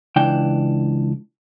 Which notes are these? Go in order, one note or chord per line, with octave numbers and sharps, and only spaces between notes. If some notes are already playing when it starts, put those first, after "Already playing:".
C#2 E3 D4 G5